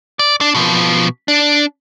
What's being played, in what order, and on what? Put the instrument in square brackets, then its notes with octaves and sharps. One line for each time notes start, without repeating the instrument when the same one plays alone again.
[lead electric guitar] D5
D4
B2 F3
D4